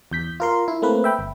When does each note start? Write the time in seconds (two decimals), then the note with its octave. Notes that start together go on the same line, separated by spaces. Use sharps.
0.11 E2 G6 B6
0.40 F4 A#4 C6
0.68 E4
0.82 A3 A#3 C4 B4
1.04 E5 G5 B5
1.19 G1